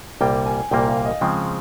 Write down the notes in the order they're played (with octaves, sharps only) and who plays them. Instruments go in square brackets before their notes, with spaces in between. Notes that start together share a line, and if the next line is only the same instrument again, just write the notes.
[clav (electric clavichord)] C2 A#2 G3 A#3 [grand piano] G5
[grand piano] G#5
[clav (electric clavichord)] C2 A#2 G3 A#3 [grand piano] G5
[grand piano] F5
D#5
[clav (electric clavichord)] C#3 F3 G#3 C4 [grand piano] G5